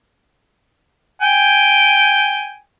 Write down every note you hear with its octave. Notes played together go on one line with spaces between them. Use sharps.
G5 G#5